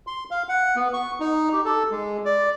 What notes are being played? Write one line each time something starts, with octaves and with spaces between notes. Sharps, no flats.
C6
F5
F#5
B3
C#6
D#4
G4
A4
G#3
D5